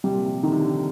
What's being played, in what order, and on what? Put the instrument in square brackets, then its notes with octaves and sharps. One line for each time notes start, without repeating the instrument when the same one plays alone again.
[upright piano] C3 [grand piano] G3
[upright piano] A#2
C3
[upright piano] D3 [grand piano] D#3
[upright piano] C3
D3